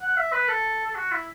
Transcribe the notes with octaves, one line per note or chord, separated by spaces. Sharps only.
F#5
E5
B4
A4
A4
F#4
E4